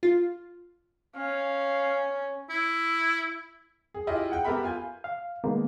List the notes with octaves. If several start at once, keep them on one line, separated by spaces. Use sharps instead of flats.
F4
C#4 F5
E4
G#4
E4 F4 G4 D#5
G#4 F#5 G5
B3 G4 A4 A#4 E5 B5
F4 G#5 G6
F5
D#3 G#3 A#3 B3